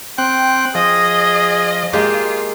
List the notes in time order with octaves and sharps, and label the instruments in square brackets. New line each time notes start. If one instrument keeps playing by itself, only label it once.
[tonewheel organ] C4 F#6 [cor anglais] G5
[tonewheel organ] F3 [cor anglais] G#4 [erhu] D#5
[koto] G#3 A#3 G4 [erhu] F4